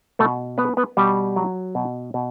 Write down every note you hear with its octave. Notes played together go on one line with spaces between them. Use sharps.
B2 A3 A4
B3 B4
B3 B4
B2 G3 G4
F#3
B2
B2